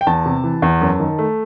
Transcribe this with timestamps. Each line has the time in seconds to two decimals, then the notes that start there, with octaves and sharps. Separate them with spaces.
0.01 G5
0.07 E2 A5
0.26 C3
0.44 E3
0.62 E2
0.81 F#2
0.99 D#3
1.19 A3